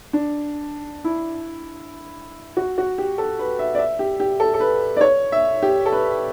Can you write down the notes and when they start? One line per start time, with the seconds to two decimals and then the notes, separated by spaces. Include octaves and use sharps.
0.13 D4
1.04 E4
2.57 F#4
2.78 F#4
2.98 G4
3.18 A4
3.39 B4
3.59 E5
3.75 D5
3.79 E5
3.99 G4
4.20 G4
4.40 A4
4.54 A4
4.60 B4
4.97 D5
5.01 C#5
5.32 E5
5.63 G4
5.86 A4
5.92 B4